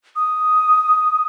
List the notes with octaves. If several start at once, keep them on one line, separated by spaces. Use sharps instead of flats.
D#6